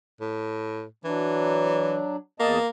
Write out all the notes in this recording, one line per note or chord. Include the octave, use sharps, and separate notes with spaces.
A2
E3 F#3 D4
E2 A#3 D#5 A5